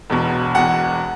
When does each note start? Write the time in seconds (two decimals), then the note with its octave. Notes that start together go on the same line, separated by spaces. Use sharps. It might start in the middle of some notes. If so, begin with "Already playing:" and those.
0.10 E1 E2 B2
0.55 E1 E2 B2 F#5